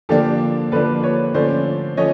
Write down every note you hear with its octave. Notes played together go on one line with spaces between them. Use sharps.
D3 F3 A#3 D4 G4 A4
D3 F3 A#3 D4 A4 B4
B4 C#5
D3 F3 A3 C#4 C5 D5
F3 A3 C#4 C#5 D#5